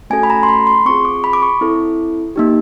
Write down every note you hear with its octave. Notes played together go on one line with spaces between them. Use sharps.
A3 C#4 F#4 A4 G#5
B5
A#5
C6
B5
C6
C4 F4 G#4 C#6
D6
B5
D6
C#6
C4 E4 A4
A#3 D#4 G4